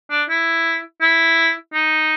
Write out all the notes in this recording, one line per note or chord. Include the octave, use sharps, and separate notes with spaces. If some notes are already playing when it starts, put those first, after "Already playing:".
D4
E4
E4
D#4